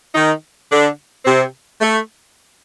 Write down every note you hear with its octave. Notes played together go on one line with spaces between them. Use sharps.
D#3 D#4
D3 D4
C3 C4
A3